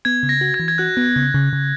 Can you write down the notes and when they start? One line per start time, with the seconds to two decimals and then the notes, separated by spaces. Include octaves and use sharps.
0.05 B3 G#6
0.23 C#3
0.29 A#6
0.41 F#4
0.54 G#6
0.60 E3
0.68 G#6
0.78 F#4 F#6
0.97 B3
1.16 C#3
1.34 C#3
1.53 C#3